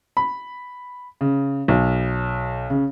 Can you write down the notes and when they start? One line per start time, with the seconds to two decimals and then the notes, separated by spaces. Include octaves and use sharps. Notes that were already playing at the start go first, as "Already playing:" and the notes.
0.17 B5
1.21 C#3
1.68 B1
2.70 C#3